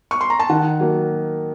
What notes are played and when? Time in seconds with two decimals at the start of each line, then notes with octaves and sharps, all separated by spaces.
0.11 C#6
0.21 C6
0.30 A#5
0.40 A5
0.49 D#3 F#5
0.80 F#3 A#3